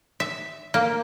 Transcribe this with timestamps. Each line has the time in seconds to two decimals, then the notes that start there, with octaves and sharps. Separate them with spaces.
0.20 E5
0.74 A#3